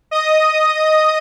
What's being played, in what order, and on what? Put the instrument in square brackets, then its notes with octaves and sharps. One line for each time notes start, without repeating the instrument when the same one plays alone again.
[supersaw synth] D#5 D#6